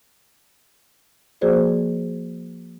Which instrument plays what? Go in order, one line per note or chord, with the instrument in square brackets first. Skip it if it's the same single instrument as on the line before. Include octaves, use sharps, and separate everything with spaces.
[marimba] F3 A#3 F#4 G#4 C5 D5